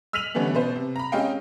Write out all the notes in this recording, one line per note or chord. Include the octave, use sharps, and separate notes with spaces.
E6 F6 B6 D#7 F7 F#7
D3 E3 G3 A3 B3 C#4
B2 B4 C5
C3
A#5 B5
G#3 C4 C#4 D#5 F5 G5